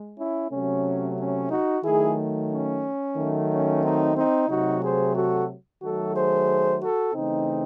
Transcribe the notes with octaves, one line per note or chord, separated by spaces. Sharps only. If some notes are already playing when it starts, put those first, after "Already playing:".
Already playing: G#3
C#4 E4
C3 F#3 A3 C#4
C#4
D#4 F#4
D#3 F#3 A3 E4 G#4
C#4
D#3 F#3 A3
C#4
C4 D#4
C4 D#4
C3 F#3 A3 D#4 F#4
G#4 C5
F#4 A4
D#3 F#3 A3 F#4 A4
G#4 C5
F#4 A4
C#3 E3 A3 C4 D#4